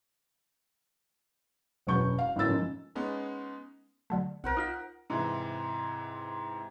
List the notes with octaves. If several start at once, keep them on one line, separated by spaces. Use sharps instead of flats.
E1 F#2 B4 C#6 G6
F5
G1 A2 A#3 C#4 E6 A6
G#2 C#3 F3
G#3 B3 C#4 D#4
D3 F#3 A3
C2 A#4 C5 F#5
D#4 F4 B6
G#2 C3 E3